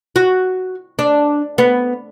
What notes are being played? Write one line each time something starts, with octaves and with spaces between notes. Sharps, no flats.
F#4
D4
B3